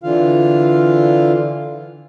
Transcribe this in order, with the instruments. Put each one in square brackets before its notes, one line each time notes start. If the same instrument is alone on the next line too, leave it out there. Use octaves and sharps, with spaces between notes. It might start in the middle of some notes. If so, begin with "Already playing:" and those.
[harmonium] D3 E3 F4 F5